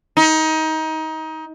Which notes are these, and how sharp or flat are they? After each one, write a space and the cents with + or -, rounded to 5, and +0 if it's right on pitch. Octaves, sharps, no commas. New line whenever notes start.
D#4 +25